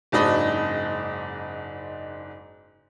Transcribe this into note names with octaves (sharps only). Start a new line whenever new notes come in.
F#1 G#2 D4 F#4 D#5 B5